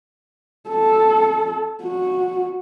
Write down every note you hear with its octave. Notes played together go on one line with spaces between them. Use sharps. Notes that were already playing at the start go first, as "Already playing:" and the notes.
A4
F#4